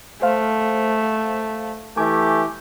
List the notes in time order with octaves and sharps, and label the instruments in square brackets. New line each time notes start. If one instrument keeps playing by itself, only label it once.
[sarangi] A3 [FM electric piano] C5 F5
[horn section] E3 A3 G4 [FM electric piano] G#5 D6